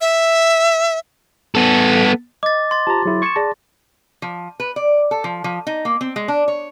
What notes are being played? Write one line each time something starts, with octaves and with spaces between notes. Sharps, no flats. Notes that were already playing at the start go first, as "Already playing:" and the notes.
E5
B3 A4
D#5 D6 A6
C6 A6
F4 G4 C5 A5 A#5
F#3 E4 G#4
C#6 G#6 C#7 E7
G#4 D5 A5 A#6
F3
B4
D5
A4
F3
F3
D#4
A#3
C4
G#3
D4
C#5